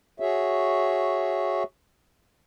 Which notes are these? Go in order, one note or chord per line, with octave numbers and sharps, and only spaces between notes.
F#4 G#4 C#5 E5